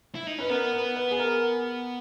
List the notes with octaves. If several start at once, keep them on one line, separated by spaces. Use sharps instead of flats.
E4
D#4
C#4 B4
B3 A#4
B4
B4
G#4
A#4